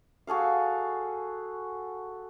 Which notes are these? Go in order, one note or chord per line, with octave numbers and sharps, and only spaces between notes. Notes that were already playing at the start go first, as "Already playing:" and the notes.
F#4 G#4 A4 F5